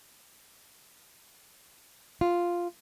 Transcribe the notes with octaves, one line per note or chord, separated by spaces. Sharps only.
F4